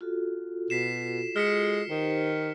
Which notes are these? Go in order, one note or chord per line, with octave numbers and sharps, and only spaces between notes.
F4 F#4 A4
B2 B6 C7 E7
G#3 F6 B6 C#7
D#3 D#4 G4 C5